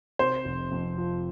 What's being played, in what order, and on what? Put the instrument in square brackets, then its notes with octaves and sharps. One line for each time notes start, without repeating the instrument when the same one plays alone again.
[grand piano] C3 [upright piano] C5
[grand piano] F1
F2
F3